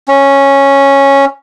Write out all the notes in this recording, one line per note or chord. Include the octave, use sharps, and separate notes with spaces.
C#4